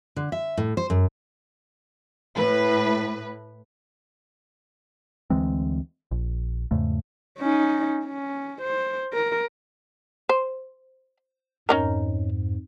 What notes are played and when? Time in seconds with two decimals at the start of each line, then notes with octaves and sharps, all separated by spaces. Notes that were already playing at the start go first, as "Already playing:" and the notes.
0.16 D3
0.32 E5
0.57 A2
0.77 C5
0.90 F#2
2.35 A2 B4
5.30 D2 E3 G#3 C4
6.11 A#1
6.71 E2 G#2 C#3 A3
7.39 C#4 D#4
8.05 C#4
8.62 C5
9.13 A#4
10.29 C5
11.69 F2 G#2 C#4 D#4 A#4